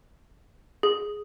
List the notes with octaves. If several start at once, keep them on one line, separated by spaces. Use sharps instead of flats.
G#4